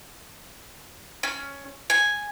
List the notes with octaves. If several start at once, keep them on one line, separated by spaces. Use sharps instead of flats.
C#4
G#5